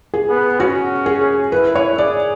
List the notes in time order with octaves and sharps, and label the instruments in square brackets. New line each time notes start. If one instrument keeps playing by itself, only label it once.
[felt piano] G#4
[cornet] B3
[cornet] C#4 [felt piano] F#4
[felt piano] G#4
[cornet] E4 [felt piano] B4
[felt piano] C#5
[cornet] G#4 [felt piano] D5